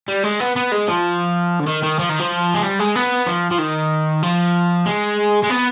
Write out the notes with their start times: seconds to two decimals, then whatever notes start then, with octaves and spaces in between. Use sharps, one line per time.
0.08 G3
0.24 G#3
0.40 B3
0.56 B3
0.72 G#3
0.88 F3
1.59 D3
1.67 D#3
1.83 D#3
1.99 F3
2.10 D#3
2.20 F3
2.54 G#3
2.63 G3
2.79 G#3
2.95 B3
3.27 F3
3.51 F3
3.59 D#3
4.23 F3
4.86 G#3
5.43 G#3
5.49 B3